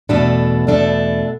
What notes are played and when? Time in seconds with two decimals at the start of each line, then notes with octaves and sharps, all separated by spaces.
0.09 E2 B2 A3 D4 A4
0.67 E2 B2 A3 D4 A4